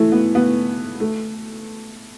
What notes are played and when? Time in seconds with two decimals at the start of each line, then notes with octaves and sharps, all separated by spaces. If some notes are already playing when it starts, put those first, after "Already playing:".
Already playing: E3 A3
0.12 B3
0.35 B3
1.00 A3